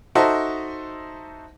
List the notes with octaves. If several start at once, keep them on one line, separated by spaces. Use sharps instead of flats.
D#4 F#4 A4 C5 D#5 E5